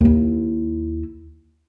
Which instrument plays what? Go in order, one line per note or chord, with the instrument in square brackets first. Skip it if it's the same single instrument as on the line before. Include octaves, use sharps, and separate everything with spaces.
[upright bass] D#2 E4